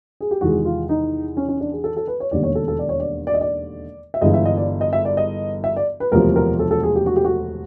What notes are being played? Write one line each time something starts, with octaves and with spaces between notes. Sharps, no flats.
G#4
G4
E2 C3 D#3 G#3 F#4
F4
D#4
C#4
C#4
D4
G#4
A4
A4
B4
C#5
E1 D#2 D3 G3 A#3 D5
C#5
A4
A4
D5
C#5
D5
D5
D#5
D5
E5
G1 G2 E3 G#3 D#5
E5
D#5
D5
D#5
E5
D5
D#5
E5
D5
B4
E1 D2 C3 F3 A#4
A#4
A4
A4
G#4
G4
F#4
G4
F#4